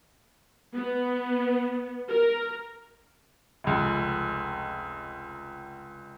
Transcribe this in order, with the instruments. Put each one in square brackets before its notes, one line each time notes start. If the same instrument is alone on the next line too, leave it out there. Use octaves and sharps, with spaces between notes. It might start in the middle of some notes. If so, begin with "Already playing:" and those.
[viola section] B3
A#4
[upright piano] F1 C#2